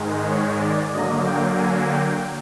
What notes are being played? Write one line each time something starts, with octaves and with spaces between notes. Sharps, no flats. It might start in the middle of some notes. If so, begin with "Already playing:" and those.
Already playing: G#2 D#3 G#3
C#5
D5
D3 F#3 A#3 D#5
G5
G#5
G5